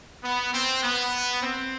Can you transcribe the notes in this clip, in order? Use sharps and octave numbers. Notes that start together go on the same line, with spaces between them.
B3
C4
B3
C4